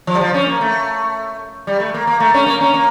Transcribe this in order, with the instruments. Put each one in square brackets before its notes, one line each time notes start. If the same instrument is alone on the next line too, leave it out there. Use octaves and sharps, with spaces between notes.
[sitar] F3
G3
F3
C#4
A#3
A3
G3
A3
A#3
A#3
A3
C#4
A#3
C#4
A#3